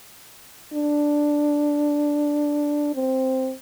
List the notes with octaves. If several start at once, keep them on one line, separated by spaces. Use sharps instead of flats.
D4
C4